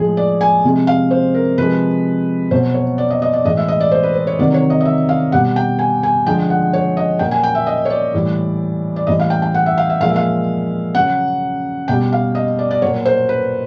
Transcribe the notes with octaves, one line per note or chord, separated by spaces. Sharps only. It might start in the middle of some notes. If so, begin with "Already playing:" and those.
Already playing: A2 F3 G#3 G#4
D5
G#5
C3 F3 G#3
F5
C5
A#4
C3 F3 G#3 B4
B2 F#3 C5
C#5
D5
D#5
D#5
D5
A2 E3 G#3 D#5
E5
D#5
D5
C5
B4
C5
C#5
C3 D#3 F#3 D5
C#5
D#5
D#5
E5
F5
B2 G3 F#5
G5
G#5
G#5
D3 F3 G#3 G5
F#5
C#5
D#5
A#2 F#3 G5
G#5
G5
E5
D#5
C#5
D5
A2 E3 G3
D5
A2 E3 G3 D#5
F5
G5
G5
F#5
E5
F5
E5
A#2 F3 G#3 F5
E5
F5
C#3 F#3 F#5
B2 G3 G5
F5
D#5
D5
D5
A#2 F#3 C#5
C5
B4